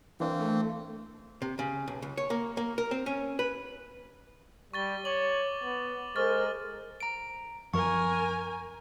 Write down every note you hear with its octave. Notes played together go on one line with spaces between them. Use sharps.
E3 A#3 C4 D4 F5
A3
C3
C#3
B1
C#2
C#5
A#3
A#3
A#4
C4
C#4
B4
G3 C#6 A6 G7
C#5 C#6 D6 F#7
B3
G#3 A4 A#4 C5 C#6 F6 A6
A#5 D7
F#2 F3 A#4 G#5 C#6